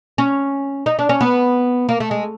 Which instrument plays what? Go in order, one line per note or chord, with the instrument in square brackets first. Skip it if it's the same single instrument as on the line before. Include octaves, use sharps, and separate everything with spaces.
[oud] C#4
D#4
D4
C#4
B3
A#3
A3
G#3